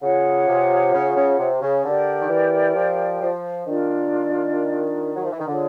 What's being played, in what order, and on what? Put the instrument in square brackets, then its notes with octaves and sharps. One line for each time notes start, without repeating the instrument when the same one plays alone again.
[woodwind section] C#3 [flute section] F4 G#4 C#5 F#5
[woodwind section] C3
C#3
C#3
C3
C#3
[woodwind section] D3 [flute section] G4 A#4 D5 G5
[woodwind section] D#3
E3
F3
F3
[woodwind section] D#3 [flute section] D4 F4 A#4 D5
[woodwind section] F#3
F3
E3
D#3
[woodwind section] D3 [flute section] F4 G#4 C#5